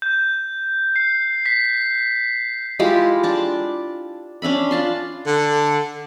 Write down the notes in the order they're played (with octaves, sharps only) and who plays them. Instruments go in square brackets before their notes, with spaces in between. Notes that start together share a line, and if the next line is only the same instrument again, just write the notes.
[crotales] G6
C7
B6
[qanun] G#3 E4 F4 G4
D4 A5 D6
C#4 D4 E5 B5
F4 A5 C6
[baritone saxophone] D3